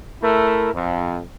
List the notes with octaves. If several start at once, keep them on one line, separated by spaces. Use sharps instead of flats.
A3 E4 A#4
F2